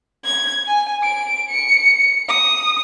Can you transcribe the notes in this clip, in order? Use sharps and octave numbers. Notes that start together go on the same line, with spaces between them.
G#6
G#5
D7
C#7
D#6